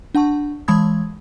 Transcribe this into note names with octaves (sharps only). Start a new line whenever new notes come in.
D4 F#5 A5 C#6
E3 G#3 A5 B5 D#6 G#6